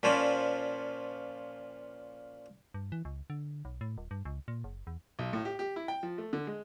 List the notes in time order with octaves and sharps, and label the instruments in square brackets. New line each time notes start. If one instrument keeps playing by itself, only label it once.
[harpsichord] A#2 F3 C#4 C5 D5 B5
[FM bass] G2
E3
C#2
D3
B1
A2
D#1
G2
C#2
A#2
F#1
E2
[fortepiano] B1
A2
G4
G4
E4
G5
F3
A3
D3
G#3